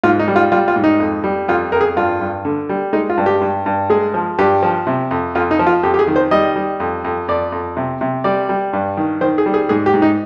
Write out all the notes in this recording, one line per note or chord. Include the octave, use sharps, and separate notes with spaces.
G#2 F4
D#4
G3
F4
G3 F4
F4
G#2
D#4
F2
G3
F2 F4
F2 A#4
G#4
G2 F4
G2
D3
G3
G#3 D#4
F4
G2
G4
G2
G2
G#3 G#4
F3
G2 G4
F3
C3
F2
F2 F4
D#4
F3
F4
F2 G4
G4
G#4
D#3
C5
G3 D#5
G3
F2
F2
F2 D5
F2
C3
C3
G3 D5
G3
G2
D#3
D#3 C5
G#4
G3
G#4
G#2 G#4
G4
G#2
D#4